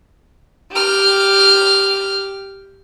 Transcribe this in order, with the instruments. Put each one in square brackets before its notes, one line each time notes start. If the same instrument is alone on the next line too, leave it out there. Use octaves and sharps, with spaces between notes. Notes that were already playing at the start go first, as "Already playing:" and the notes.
[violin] G4 F6